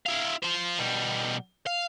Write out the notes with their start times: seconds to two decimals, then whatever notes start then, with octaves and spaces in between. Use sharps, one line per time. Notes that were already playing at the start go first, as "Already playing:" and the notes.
0.06 E4 F5
0.43 F4 C5
0.78 B2 G3
1.67 F5